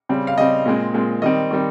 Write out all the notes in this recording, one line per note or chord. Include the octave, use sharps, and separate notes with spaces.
C#3 G3 C4
F5
C#3 G3 C4 D#5
A#2 G#3 C4
A#2 G#3 C4
D#3 G3 C4 D#5
D#3 G3 C4